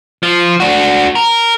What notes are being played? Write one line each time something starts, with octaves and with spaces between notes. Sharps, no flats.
F3
D4 F#4
A#4